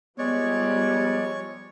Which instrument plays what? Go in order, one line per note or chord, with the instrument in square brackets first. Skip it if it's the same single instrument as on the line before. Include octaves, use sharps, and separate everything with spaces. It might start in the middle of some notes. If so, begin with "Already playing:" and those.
[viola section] F3 G3 [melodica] G#3 D5 [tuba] B3 [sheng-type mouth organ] C#5